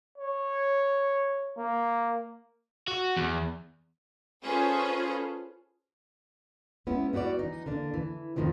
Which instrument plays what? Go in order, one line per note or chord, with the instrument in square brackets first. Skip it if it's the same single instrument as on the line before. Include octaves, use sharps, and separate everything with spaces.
[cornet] C#5
A#3
[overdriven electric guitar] F#4
E2
[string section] C#4 F4 G#4 A4 B4 C5
[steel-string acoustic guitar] G#3 B3 C#4 E4
G3 B3 F#4 B4 D5
E3 D#4
D3 A#3 D4
E3
F2 A2 D#3 F3 G3